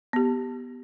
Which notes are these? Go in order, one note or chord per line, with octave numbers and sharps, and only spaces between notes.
B3 G4